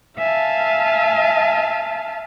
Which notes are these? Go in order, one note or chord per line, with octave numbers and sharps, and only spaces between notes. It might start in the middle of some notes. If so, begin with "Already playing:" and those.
E5 F5 G#5 A5